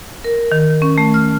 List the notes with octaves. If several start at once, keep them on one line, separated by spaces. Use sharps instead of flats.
A#4
D#3
C#4
A3
F6